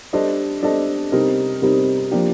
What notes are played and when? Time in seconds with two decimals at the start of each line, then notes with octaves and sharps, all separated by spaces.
0.13 G3 D4 A4 C5 D#5
0.62 G3 D4 A4 C5 D#5
1.12 C3 G3 C4 D#4 A#4
1.62 C3 G3 C4 D#4 A#4
2.11 F3 A#3 D4 G4